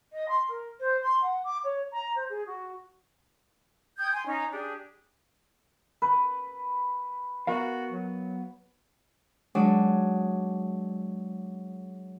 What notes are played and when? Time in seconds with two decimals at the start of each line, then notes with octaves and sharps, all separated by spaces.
0.12 D#5
0.28 C6
0.48 A#4
0.79 C5
1.02 C6
1.22 F#5
1.44 D6
1.63 C#5
1.91 A#5
2.15 C5
2.29 G#4
2.46 F#4
3.98 G5 D#6 G6 G#6
4.12 G#5 C6
4.25 C#4 D#4
4.52 D4 G4 G#4
6.02 B4
7.47 B3 F#4 A#4 F5
7.91 F#3
9.55 F#3 G#3 D4